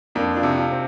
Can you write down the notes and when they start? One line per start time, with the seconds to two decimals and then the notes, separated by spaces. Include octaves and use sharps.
0.15 F2 A#3 D4
0.36 D4 F4
0.43 C3
0.57 D4 F4
0.71 C4